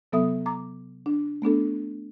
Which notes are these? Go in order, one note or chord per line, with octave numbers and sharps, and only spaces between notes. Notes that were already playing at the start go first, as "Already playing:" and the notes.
C3 F#3 B3 A4 E5 D#6
A#5 D6
D4
A3 B3 D4 A4